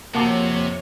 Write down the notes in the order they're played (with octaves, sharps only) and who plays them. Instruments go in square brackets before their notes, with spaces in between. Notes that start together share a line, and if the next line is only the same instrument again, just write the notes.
[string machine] F2 C#5 [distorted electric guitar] C3 [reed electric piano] A#3 [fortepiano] F#4 A5 D6